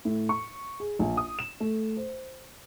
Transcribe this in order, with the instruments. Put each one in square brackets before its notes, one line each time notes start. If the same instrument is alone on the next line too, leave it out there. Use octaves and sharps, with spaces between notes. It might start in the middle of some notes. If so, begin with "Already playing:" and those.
[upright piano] A2
C#6
G#4
A#1
D#6
E7
A3
C5